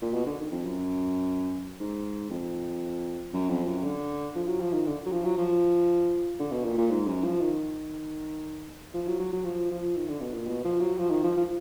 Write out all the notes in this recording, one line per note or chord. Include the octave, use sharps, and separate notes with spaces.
A#2
B2
D3
D#3
F2
F#2
G#2
F2
F#2
F2
F#2
D3
F3
F#3
F3
D#3
D3
F#3
F3
F#3
F3
D3
B2
A#2
A#2
G#2
F#2
F3
D#3
F3
F#3
F#3
F#3
F3
F3
D#3
D3
B2
A#2
B2
F3
F#3
F3
D#3
F3
F3